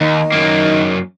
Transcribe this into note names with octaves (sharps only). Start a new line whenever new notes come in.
D#2 D#3 D#4
F#2 A#3